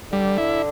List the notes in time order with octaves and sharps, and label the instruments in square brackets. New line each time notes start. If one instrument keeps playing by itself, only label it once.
[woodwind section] D3 [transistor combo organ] G3
[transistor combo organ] E4